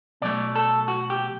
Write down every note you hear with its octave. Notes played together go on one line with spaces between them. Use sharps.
B2 F#3 A3 D5
A4
F#4
G4